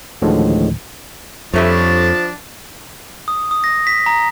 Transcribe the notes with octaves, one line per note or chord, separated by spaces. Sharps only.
D2 A2 D3 D#3 F3 G#3
F2 F3 G3 A3 D4 C#5 A5
D#6
D#6
A#6
B6
A#5